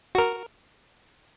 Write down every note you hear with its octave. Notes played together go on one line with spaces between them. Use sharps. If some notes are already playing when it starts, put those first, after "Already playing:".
F#4 A#4